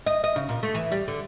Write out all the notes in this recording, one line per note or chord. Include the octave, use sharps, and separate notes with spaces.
D#5
D#5
C#3
A#2
A3
E3
G3
D3